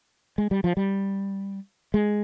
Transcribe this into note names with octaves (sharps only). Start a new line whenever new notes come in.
G#3
G3
F3
G3
G#3